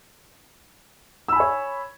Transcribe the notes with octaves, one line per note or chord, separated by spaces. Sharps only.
C#5 G#5 B5 E6